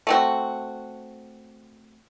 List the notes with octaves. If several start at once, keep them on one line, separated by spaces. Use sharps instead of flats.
A3 C4 F#4